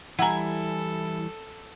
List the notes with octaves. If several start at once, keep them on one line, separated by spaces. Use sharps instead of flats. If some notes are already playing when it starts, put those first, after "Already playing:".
E3 G3 E4 A4 F#5 G#5 A#5